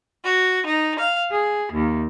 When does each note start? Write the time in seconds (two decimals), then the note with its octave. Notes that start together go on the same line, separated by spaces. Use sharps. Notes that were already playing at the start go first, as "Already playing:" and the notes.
0.25 F#4
0.65 D#4
0.99 F5
1.31 G#4
1.72 D#2